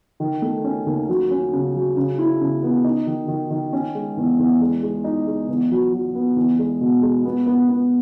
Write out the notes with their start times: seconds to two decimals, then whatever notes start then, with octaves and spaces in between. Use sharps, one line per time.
0.20 D#3
0.42 A3
0.64 C#4
0.86 D#2
1.09 F#3
1.30 C#4
1.53 C#3
1.75 F#3
1.97 C#3
2.18 E4
2.41 C#3
2.63 B3
2.84 D#4
3.07 D#3
3.28 D#3
3.50 D#3
3.73 C#4
3.95 G#3
4.17 E2
4.39 E2
4.61 G#3
4.83 G#3
5.04 D#4
5.27 G#3
5.49 E2
5.71 F#3
5.93 F#3
6.15 B3
6.36 E2
6.59 G#3
6.81 B2
7.02 G#3
7.25 B3
7.47 B3
7.69 B3